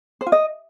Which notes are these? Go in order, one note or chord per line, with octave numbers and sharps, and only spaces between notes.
C5
F4
D#5